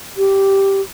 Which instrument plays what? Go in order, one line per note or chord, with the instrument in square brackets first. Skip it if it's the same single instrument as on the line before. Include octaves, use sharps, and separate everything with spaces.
[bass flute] G4